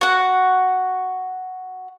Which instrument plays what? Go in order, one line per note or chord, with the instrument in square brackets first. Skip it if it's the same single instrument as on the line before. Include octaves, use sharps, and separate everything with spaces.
[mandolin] F#4 F#5